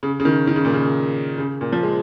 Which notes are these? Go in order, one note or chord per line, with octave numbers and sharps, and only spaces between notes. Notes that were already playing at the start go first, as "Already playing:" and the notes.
C#3
C#3
D#3
D#3
C#3
A#2
C#3
C#3
A#2
F3
G#3